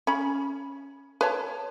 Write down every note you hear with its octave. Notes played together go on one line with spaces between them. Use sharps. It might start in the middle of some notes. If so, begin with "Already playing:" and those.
C#4 B5
B4 C#5 A5